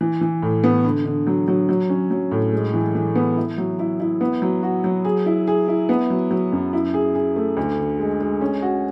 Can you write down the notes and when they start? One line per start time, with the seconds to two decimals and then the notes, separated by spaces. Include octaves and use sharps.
0.01 E3
0.21 E3
0.42 A2
0.64 B3
0.84 D3
1.06 D3
1.27 F#3
1.48 F#3
1.69 F#3
1.90 C#4
2.11 F#3
2.31 A2
2.52 G#3
2.74 E3
2.95 E3
3.15 B3
3.37 E4
3.58 F#3
3.79 E4
4.00 E4
4.21 B3
4.42 F#3
4.63 F#4
4.84 F#3
5.05 G#4
5.26 E4
5.48 G#4
5.68 E4
5.89 B3
6.10 F#3
6.31 F#3
6.52 F#2
6.73 E4
6.94 G#4
7.15 G#4
7.36 A3
7.57 D2
7.78 D3
7.99 G#3
8.20 G#3
8.41 C#4
8.62 F#4